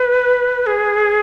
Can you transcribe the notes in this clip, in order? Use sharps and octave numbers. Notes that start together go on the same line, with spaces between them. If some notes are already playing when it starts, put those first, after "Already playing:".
Already playing: B4
G#4